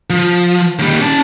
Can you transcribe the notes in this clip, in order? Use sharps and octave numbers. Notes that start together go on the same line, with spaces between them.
F3
D#2 G3
C#4 A5